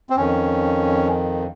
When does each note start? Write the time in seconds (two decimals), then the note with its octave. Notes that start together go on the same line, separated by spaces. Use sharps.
0.10 C4
0.16 F2 D#3 C#4